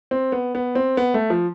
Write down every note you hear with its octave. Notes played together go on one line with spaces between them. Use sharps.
C4
B3
B3
C4
B3
A3
F3